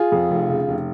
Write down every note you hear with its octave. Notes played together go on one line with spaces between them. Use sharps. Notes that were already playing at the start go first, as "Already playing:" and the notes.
Already playing: F4 G#4
F2
F1
C#3
F1